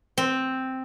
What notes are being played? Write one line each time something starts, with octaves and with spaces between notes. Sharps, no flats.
C4